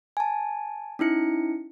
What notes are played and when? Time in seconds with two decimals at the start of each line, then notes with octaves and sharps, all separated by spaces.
0.17 G#5 A5
0.99 C#4 D#4 E4 C#7